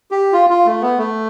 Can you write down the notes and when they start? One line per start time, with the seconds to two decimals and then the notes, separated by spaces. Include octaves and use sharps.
0.11 G4
0.33 F4
0.50 F4
0.66 A3
0.82 B3
0.98 A3